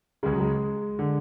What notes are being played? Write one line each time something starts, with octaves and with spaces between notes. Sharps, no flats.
C#2 C#3 G#3
F#3
G#3
D3